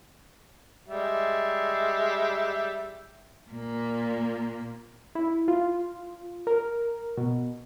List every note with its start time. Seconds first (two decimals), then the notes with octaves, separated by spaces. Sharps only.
0.88 G3 G#3 E5
3.51 A#2 A#3
5.15 E4
5.48 F4
6.47 A#4
7.17 B2